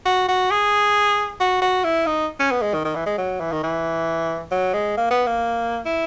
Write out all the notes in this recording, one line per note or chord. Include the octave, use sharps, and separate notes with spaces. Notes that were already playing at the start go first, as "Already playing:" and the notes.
F#4
F#4
G#4
F#4
F#4
E4
D#4
C#4
B3
G#3
D#3
D#3
E3
G#3
F#3
E3
D#3
E3
F#3
G#3
A#3
B3
A#3
E4